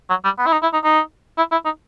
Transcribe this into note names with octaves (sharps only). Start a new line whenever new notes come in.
F#3
G3
B3
E4
D#4
E4
D#4
D#4
E4
E4
D#4